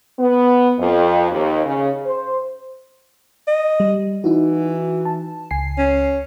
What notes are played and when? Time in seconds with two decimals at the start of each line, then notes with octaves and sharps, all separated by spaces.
0.19 B3
0.78 F2
1.31 D#2
1.65 C#3
2.05 C5
3.47 D#5
3.80 G3
4.24 E3 D#4 E4 F#4
5.05 A5
5.51 C#2 G#5 C7
5.78 C#4